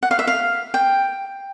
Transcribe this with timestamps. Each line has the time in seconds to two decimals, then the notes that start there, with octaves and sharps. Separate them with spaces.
0.03 F#5
0.11 F5
0.19 E5
0.27 F5
0.74 G5